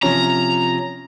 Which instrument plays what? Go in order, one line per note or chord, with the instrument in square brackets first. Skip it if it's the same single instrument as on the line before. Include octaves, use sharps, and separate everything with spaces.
[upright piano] C3 F3 C#4 [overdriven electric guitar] A#5